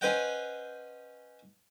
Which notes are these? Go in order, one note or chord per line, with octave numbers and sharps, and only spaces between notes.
C#4 B4 C5 D#5 F#5 G5